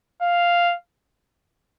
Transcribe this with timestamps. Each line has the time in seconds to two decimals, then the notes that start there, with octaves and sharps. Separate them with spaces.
0.22 F5